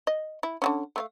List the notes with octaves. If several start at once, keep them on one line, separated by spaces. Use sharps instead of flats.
D#5
E4
D3 D#3 C#4
A3 C4 F5